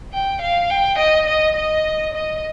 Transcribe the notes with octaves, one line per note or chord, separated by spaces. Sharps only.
G5
F5
G5
D#5
D#5
D#5
D#5